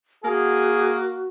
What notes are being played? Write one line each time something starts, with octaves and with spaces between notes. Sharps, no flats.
A#3 F#4 G#4